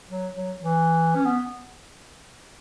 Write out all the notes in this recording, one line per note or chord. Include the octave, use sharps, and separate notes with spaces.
F#3
F#3
E3
C#4
B3